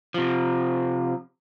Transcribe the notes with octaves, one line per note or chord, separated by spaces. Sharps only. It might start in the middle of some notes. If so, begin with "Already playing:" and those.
C3 F3